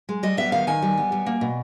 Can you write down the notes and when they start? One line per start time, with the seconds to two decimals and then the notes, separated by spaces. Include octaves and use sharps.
0.09 G#3
0.23 G3 D#5
0.37 B3 E5
0.52 D#3 F5
0.67 D#3 G#5
0.82 G3
0.98 B3
1.12 G3
1.26 A#3
1.41 B2